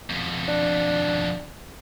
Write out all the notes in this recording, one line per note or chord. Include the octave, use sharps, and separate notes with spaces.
F2 B2
D4